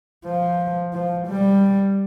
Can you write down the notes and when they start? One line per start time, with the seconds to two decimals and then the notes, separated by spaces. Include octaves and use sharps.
0.25 F3
0.93 F3
1.28 G3